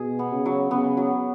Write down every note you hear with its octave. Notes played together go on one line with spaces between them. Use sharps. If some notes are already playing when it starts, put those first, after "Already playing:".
Already playing: B2 G#4
B3
C#3
F#3
C#3 B3
F#3